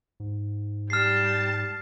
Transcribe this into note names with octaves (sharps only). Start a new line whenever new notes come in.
G#2
G3 A5 F6 C7